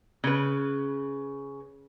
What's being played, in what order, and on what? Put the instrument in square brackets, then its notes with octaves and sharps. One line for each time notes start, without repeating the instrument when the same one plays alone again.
[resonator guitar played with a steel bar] C#3 B4